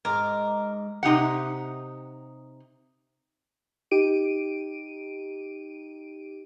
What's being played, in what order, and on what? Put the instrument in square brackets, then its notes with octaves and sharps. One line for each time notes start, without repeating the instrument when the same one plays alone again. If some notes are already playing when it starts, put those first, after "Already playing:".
[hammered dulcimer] G#2 A#5 D6 [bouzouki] A#4
[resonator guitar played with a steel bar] C3 D#4 G4 F#5
[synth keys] D#4 G4 D7 D#7